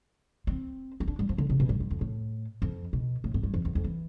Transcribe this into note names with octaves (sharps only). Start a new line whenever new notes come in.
C4
C4
D4
G3
F3
D3
C3
B2
G2
G2
F2
A2
F2
B2
A2
A2
G2
F2
E2
F2
E3